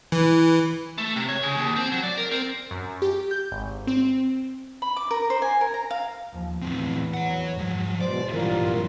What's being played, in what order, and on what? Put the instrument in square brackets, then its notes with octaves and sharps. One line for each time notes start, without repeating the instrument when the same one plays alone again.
[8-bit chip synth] E3
[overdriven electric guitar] A3
C3
C#5
C#3
D#2
C4
F#3
D5
A#4
C4
[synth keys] F#2
G4
G6
G#1
C4
[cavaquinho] B5
D6
A#4
C5
G#5
A#4
A#5
F5
[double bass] D#2 F3
[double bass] E2 [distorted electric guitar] A2 C4
[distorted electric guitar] C#5 F#5
[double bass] G#2 [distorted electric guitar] F3 F#3
[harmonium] E2 B2 C5 [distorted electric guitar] D5
[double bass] A#1 F#3 [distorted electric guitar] G2 E3 [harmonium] G3 F4 A#4